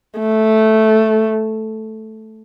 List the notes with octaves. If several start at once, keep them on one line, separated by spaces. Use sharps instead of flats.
A3